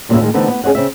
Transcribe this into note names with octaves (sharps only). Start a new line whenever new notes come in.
G2 A#2 C#3 E3 B3 E5
A2 D#3 G#3
D3 E3 A3 B3 C4 D#4
B3
C#4 G#4 C#5 D#5 F#5
C#3 C4 E5